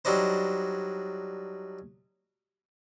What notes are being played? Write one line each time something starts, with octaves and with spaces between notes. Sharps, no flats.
F#3 G3 D4 D#4 C5